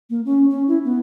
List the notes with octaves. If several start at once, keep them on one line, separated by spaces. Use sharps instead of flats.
A#3
C#4
C#4
E4
B3